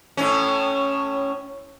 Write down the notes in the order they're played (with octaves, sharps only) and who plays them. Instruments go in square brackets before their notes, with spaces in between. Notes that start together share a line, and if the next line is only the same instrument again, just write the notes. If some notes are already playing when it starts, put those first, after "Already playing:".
[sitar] A2 C#4